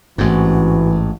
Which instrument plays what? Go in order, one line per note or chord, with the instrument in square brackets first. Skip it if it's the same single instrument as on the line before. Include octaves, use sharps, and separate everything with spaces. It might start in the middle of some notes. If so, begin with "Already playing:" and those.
[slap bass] A1 G#2 [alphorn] E3 [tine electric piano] A3 C4 C#4 [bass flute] F#4